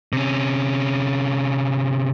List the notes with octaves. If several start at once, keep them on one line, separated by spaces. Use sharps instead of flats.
C3 C#4